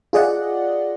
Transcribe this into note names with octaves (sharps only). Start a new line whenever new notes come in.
F4 G#4 D5 D#5 F#5